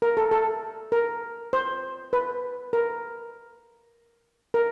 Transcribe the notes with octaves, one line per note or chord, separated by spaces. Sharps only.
A#4
A4
A4
A#4
C5
B4
A#4
A#4